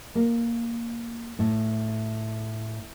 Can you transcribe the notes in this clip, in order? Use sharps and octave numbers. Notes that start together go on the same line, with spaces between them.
A#3
A2